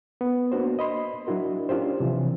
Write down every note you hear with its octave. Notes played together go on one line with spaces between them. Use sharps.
B3
A#3 B3 D4 F#4 C5
D#5 B5 C6
F#3 D4 E4 F#4 A#4
C#4 D4 F4 G4 C5
C3 E3 F3